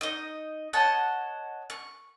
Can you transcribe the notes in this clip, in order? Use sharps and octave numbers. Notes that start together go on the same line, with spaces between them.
D#4 D#5
C#5 D#5 F#5 A5
C#6